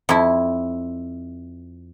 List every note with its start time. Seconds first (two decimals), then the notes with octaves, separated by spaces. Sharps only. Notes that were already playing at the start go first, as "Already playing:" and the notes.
0.09 F2 E4